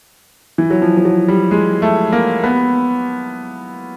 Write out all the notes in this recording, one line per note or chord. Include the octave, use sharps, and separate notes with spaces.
E3
F#3
F3
F3
F#3
G3
G#3
A3
A#3
B3